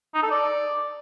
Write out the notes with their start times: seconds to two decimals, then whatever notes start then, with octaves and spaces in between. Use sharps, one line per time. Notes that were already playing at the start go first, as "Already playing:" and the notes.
0.14 D#4
0.23 A4
0.31 D5